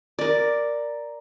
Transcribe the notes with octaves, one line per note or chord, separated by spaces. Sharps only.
A#4 D5